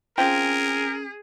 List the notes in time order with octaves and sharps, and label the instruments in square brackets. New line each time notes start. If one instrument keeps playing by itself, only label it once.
[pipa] C4 F4 G5 [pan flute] C#4 [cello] G#4 [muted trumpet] A#4